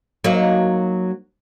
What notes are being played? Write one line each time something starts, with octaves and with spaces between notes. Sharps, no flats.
F#3 A#3 D#4